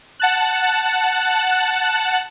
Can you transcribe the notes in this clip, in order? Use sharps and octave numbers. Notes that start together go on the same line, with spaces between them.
F#5 A5 F#6